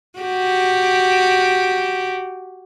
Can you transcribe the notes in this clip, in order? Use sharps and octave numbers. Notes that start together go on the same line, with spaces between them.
F#4 G4